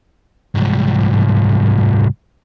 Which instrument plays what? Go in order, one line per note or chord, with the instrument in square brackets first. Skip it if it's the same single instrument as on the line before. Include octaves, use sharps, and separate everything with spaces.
[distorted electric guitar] C2 G#2